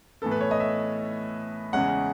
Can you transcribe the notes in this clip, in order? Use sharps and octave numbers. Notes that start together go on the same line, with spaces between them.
A2 E3 B3 A4
B4
C#5
D#5
E5
E2 C#3 G#3 C#4 F#5